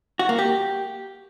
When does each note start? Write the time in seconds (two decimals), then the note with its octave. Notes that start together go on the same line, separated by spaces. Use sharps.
0.19 F#4
0.29 A#3
0.39 G4